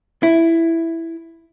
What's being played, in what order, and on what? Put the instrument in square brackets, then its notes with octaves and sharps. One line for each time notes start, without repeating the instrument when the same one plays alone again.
[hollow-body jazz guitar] E4